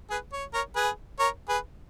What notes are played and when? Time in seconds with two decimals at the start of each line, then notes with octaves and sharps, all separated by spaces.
0.10 G#4 B4
0.33 C#5
0.54 A#4 C#5
0.76 G#4 B4
1.19 A#4 C#5
1.49 G#4 B4